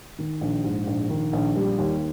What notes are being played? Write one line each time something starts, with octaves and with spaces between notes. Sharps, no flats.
D#3
A#1
G#2
A#1
D#3
A#1
G3
D#2